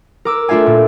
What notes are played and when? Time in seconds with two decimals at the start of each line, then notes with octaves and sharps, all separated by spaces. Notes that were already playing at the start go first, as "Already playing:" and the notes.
0.25 A#4 D6 E6
0.48 A3 D4 F4 E5 F5 G#5
0.66 A#2